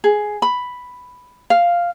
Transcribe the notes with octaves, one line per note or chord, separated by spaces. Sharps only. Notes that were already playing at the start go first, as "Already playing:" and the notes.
G#4
B5
F5